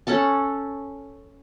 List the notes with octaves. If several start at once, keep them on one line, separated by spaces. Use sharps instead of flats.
C#4 A4 F#5 A5